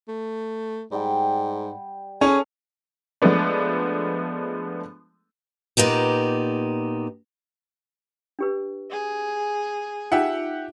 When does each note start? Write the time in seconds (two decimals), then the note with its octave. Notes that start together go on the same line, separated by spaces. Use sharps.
0.08 A3
0.92 G#2 G3 F#5 G5
2.21 C#4 G#4 A4 G#5
3.22 F3 G#3 A3 B3 D4
5.77 A#2 B3 D#4 G4
8.39 D4 G4 B4
8.91 G#4
10.12 D#4 F4 G4 E5 F#5